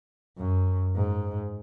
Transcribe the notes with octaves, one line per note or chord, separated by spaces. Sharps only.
F#2
G#2